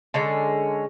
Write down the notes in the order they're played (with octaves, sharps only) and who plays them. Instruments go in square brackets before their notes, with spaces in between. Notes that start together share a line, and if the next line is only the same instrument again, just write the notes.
[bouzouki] D3 G#3 C#4